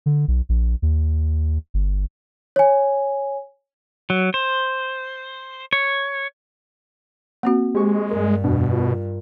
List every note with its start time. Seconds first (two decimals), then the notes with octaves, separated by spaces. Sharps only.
0.06 D3
0.28 B1
0.49 A#1
0.82 D#2
1.74 G1
2.56 C#5 G#5
4.10 F#3
4.34 C5
5.73 C#5
7.43 A#3 C4 F#4
7.75 G#3 G4 C5 C#6
8.11 G2 A#4
8.44 F2 B2 D4
8.73 F4 A#4